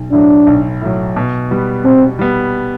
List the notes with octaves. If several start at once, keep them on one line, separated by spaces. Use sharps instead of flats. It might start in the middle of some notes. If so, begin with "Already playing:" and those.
Already playing: B1
A2 F#3 D4
B1
A2 F#3
B2
G3 B3
B2 C4
G3 B3